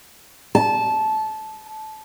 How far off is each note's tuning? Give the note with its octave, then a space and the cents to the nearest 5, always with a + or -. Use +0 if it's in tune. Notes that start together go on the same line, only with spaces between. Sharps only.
A5 -15